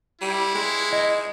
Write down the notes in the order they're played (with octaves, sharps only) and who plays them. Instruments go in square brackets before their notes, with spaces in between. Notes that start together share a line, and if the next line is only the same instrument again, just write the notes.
[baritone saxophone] G3 [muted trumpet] E4
[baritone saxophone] G#3
[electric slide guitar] D#5